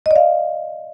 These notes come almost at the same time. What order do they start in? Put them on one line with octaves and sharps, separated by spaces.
D#5 D5 F5